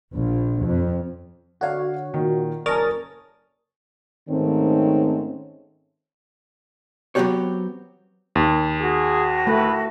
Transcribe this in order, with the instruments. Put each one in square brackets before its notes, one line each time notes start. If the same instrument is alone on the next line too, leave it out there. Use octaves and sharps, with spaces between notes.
[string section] A#1
F2
[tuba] D3 [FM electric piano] F#4 C#5 [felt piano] A4 D5 F5
[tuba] A#2 [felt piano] D#3
[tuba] F#1 [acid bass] A#4 [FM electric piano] C#5 D#6 A6 [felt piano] D5 G#5 A5
[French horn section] G#2 D#3 A3 C4 C#4 C#5
[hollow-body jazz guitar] F#3 B3 C4 F#4 G4 C#5
[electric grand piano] D#2
[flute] F#4 [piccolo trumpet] G#4
[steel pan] A3 [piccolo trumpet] B4